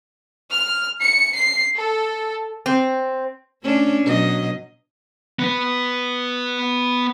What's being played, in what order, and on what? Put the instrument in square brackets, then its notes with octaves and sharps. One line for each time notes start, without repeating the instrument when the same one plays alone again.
[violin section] F6
C#7
C7
A4
[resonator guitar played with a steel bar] C4
[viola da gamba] A3 C#4 D4
B2 F#3 D#5
[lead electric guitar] B3 B4